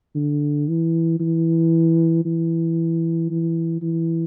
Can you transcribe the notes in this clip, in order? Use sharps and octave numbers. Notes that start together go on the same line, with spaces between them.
D3
E3
E3
E3
E3
E3